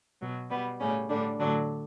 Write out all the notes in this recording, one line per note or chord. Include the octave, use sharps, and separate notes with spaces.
B2 F#3
B2 G3 B3
A2 C#3 G3 C#4
A2 D3 G3 D4
A2 D3 F#3 D4